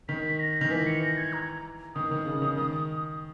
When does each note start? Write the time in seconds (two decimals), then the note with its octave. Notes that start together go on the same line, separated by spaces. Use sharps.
0.08 D#3 B6
0.40 A#6
0.61 D#3
0.70 E3 B6
0.86 C#7
1.02 A#6
1.18 G#6
1.33 A#5
1.95 D#3 D#6
2.11 D#3
2.26 C#3
2.42 D#3
2.57 D#3